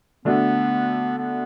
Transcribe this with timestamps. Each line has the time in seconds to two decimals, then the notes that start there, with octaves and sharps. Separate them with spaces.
0.25 D3 A3 B3 D4 F#4
1.17 B3